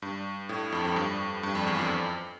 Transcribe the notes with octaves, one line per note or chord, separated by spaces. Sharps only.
G2
A2
F2
F2
G2
G2
F2
E2
F2